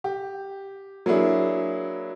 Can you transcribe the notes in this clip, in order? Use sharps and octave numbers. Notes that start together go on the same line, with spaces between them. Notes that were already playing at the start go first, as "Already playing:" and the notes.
G4
F#3 A#3 D4 E4 G#4